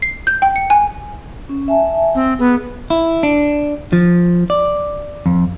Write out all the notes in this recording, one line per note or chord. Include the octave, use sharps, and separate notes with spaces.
C7
G6
G5
C#7
G#5
C#4
E5 G#5 A5
C4
B3 G#4
E4
D4
F3
D5
F2